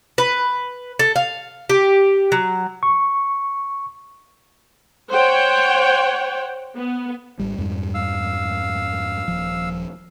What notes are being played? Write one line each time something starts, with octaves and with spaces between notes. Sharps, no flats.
B4
A4
F5
G4
F#3
C#6
C5 C#5 F#5 G5
B3
G#1 C#2 G3
F2 G#2 G3
F5 E6
D#1 F3